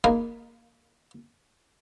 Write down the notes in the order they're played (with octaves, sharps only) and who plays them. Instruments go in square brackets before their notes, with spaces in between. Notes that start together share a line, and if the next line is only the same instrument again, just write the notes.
[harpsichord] A#3 D#4 G#4 A#4 B4 F5